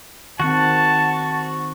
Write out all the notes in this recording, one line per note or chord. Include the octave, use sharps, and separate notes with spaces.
D#3 C4 F#4 F#5 A5 C#6